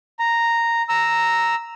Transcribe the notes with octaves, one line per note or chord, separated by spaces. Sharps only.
A#5
A#5 E6